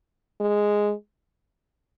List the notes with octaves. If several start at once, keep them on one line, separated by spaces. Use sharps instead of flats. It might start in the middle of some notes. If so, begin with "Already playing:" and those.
G#3